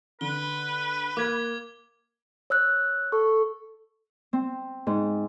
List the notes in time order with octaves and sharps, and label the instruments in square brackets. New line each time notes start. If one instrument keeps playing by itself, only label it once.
[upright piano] D3 [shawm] B4 [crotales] G7
[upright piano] A#3 [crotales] D6 G#6
[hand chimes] C#5 E6 F#6
[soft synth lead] A4 [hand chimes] C#6
[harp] C4
G#2